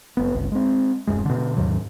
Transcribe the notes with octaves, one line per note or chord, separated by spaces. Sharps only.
F#1 B3
G1 C#2
G#3 C4
D#1 C2 F#2 G#3
B2 D3
D#2 G#2 F#3